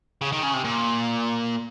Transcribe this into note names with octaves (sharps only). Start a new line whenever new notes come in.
C#3
D#3
C#3
C3
A#2